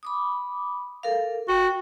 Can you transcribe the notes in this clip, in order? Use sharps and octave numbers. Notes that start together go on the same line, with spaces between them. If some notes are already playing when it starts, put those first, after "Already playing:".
B5 D6 D#6
A4 A#4 F5
F#4 G5